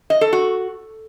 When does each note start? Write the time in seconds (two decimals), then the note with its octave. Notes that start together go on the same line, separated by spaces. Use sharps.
0.10 D#5
0.21 A4
0.33 F#4